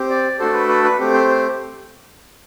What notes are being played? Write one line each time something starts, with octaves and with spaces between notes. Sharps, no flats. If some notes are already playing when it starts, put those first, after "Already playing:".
Already playing: C4 G4
D5
A3 D4 F#4 A4 C5
B4
B4
B4
A3 C4 G4
C5
C5